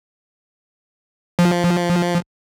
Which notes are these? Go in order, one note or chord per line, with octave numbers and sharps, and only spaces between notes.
F3